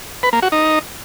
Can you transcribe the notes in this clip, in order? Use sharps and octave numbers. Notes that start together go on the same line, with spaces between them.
B4
A#3
F#4
D#4